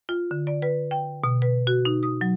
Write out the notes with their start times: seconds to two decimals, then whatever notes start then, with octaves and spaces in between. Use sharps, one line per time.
0.09 F4
0.31 D3
0.47 D5
0.62 B4
0.91 G5
1.24 B2
1.42 B4
1.67 F#4
1.85 D#4
2.03 D#6
2.21 F#3